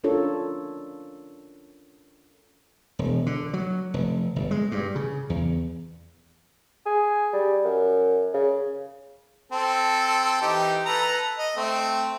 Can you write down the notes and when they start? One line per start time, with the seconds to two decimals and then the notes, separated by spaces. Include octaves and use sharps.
0.04 C#4 D4 F4 A4 A#4 C#5
2.99 E1
3.26 D3
3.53 F#3
3.94 F1
4.36 G1
4.51 G#3
4.72 G2
4.95 C#3
5.30 E2
6.86 G#4
7.33 G3
7.65 F#2
8.34 C#3
9.52 C4 A4
10.42 E3 D#4 G4
10.85 A4 B4 A#5
11.37 D#5
11.56 A3 C4